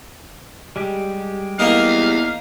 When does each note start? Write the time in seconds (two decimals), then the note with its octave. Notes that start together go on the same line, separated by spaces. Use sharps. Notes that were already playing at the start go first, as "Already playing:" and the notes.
0.76 G3 G#3 G4
1.59 E2 A#3 D#4 F5